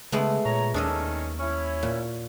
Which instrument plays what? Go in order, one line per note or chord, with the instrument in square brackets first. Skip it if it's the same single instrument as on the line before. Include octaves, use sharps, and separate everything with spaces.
[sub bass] C#3 [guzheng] G#3 A3 B3
[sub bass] A#2 [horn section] C#5 A#5
[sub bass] D#2 [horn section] D#3 C#4 [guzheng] D4 A4 D#5
[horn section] C#4 E4
[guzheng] A#2